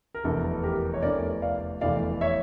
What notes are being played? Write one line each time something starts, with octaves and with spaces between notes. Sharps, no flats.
A#4
F1 E2 E3 A3 A4
G4 A#4
C#5
F1 E2 E3 A3 A#4 D5
D5 F5
F1 E2 E3 A3 D5 F5
C#5 E5